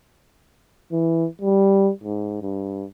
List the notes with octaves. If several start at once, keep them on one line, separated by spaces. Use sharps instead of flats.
E3
G3
G#2
G2